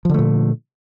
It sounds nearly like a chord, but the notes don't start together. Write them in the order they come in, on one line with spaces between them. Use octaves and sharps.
F3 D3 A3 A#2